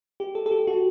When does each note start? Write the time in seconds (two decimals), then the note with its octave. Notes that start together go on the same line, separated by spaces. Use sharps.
0.20 G4
0.35 A4
0.46 A4
0.51 G4
0.67 F#4